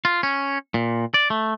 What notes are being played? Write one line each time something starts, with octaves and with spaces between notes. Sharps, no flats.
F4
C#4
A#2
D5
A3